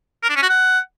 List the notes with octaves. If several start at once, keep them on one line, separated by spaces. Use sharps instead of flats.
A#4
D4
C#4
F#4
F#5